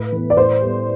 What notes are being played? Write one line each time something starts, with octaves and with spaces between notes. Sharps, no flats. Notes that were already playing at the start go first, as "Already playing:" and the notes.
Already playing: A2 B4
E3 B3
D5
A2 C5
G3 B3